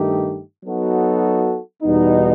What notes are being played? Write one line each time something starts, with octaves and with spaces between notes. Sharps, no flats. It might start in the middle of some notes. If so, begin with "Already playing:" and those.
Already playing: G2 D#3 A3 D#4 G4
F#3 B3 D#4 F#4 A4
E2 B2 G3 B3 D#4